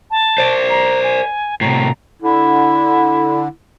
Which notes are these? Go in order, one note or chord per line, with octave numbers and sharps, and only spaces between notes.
A5
C5 D5
A#5
G#5
A2 C3 A#5
D3 E4